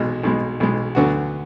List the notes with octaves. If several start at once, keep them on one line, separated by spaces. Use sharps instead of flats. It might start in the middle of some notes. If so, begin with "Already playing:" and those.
Already playing: B1 B2 G#3
B1 B2 G#3
B1 B2 G#3
D2 D3 F#3 B3 F#4